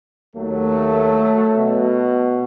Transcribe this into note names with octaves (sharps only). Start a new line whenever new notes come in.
D#2 F#3 A3
B2